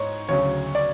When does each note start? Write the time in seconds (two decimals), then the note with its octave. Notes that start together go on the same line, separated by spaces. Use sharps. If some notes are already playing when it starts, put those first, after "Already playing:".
Already playing: G#2 C#5 D#5
0.29 D2 C#3 F#3 C#5
0.75 D5